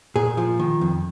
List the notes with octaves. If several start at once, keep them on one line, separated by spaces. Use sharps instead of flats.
A#2 G#4
F3
D#3
F2